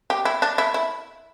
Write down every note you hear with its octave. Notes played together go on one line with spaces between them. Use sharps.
G4
E4
D4
E4
E4